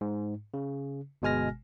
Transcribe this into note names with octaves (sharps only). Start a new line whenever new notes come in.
G#2
C#3
G1 B2 G#3 G#5 F6 A#6